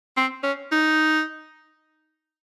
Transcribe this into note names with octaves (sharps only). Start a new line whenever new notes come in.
C4
C#4
D#4